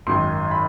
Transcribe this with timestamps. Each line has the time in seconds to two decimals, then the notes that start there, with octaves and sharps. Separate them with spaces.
0.07 G#1 F#2 D#3 C6
0.51 B5